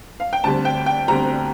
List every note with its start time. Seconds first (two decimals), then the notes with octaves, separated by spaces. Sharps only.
0.20 F5
0.33 G5
0.44 D2 D3 G3 C4 A5
0.65 G5
0.86 G5
1.08 D2 D3 G3 C4 A#5